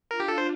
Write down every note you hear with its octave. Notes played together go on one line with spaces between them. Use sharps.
D4 F4 A#4
G4
A4
C5